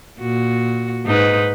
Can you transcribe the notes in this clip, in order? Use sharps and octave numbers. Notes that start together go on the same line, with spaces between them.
A#2 F#4
G#2 D#4 B4